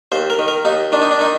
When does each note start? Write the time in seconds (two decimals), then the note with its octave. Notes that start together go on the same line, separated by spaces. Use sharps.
0.12 D#2 C5
0.30 A#4
0.39 D#3
0.48 A#4
0.65 D#2 D#4
0.92 D#3 D4
1.02 D#4
1.11 D4
1.19 D#3 D#4